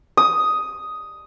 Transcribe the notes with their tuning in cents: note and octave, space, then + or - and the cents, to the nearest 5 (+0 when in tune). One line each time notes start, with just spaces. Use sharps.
D#6 +5